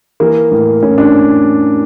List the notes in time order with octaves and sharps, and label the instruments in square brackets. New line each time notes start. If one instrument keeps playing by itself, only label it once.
[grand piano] E3 A#3
A2
A2 C#4
D4